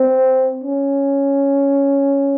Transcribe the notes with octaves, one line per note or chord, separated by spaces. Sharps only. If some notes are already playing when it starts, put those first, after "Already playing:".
Already playing: C4
C#4